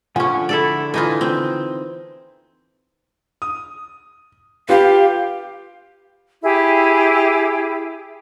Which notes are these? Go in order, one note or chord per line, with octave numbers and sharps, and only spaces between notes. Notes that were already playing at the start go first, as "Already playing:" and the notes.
D3 F3 C#4 F#5 G#5
E4 A4 D5
E3 D#4 F4
C4
D#6
F4 G4 B4 F5
E4 G4 G#4